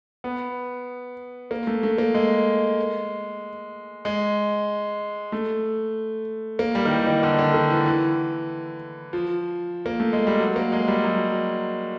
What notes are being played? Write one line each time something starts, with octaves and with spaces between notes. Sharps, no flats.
B3
A#3
A3
A3
A#3
G#3
G#3
A3
A#3
G3
D#3
E3
D#3
D3
D3
D#3
E3
E3
F3
A#3
A3
G#3
G3
F#3
A#3
G#3
G3
F#3